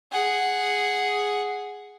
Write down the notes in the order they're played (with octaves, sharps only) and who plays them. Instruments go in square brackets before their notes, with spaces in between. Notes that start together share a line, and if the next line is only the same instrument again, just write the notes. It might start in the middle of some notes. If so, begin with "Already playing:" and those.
[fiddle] G#4 F#5